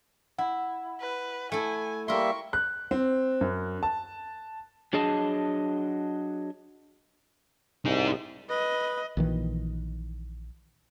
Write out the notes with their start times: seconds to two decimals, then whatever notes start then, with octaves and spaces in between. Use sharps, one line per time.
0.39 E4 F#5
1.00 B4
1.52 A3 E4 G#5
2.08 G3 A#3 A#4 E5 C6 C#6
2.53 F#6
2.91 C4
3.41 F#2
3.83 A5
4.93 F#3 D4 G#4 D#5 A5
7.86 C2 D#4 G#4
8.50 B4 D#5
9.17 A#1 D#3 E3